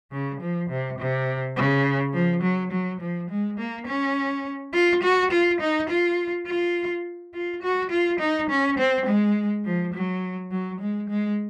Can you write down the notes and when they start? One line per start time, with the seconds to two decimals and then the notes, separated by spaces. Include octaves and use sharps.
0.12 C#3
0.41 F3
0.70 C3
0.99 C3
1.57 C#3
2.14 F3
2.43 F#3
2.72 F#3
3.01 F3
3.30 G#3
3.58 A#3
3.87 C#4
4.73 F4
5.03 F#4
5.32 F4
5.61 D#4
5.89 F4
6.47 F4
7.34 F4
7.63 F#4
7.91 F4
8.20 D#4
8.50 C#4
8.78 C4
9.06 G#3
9.65 F3
9.94 F#3
10.51 F#3
10.81 G#3
11.09 G#3